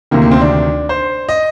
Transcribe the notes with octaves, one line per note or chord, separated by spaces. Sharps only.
D2 C3 D#3 A#3
A#3
C4
D4
C5
D#5